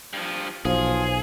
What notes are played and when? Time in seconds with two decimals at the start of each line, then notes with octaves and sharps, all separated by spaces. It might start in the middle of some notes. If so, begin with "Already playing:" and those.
0.13 G2 F3
0.65 B1 F3 G#4